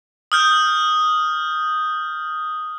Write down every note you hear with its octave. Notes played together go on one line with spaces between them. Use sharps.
D#6 F6 G6